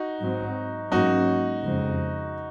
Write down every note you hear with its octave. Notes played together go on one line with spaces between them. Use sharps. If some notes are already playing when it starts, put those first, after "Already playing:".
Already playing: D#4 F#4
G#2 F#3 C4
G#2 F#3 A#3 C#4 D#4 F#4
F2 C#3 G#3 C4